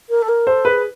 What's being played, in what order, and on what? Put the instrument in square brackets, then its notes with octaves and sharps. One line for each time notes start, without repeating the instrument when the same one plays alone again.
[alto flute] A#4
A4
A#4
[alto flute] A4 [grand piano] C5
[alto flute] G#4 [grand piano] B4